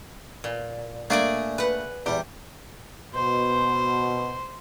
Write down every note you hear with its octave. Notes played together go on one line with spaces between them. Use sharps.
A#2
A3 A#3 D4 G#4 D5 G#5
B4 F#5
E2 G3 G4
B2 C5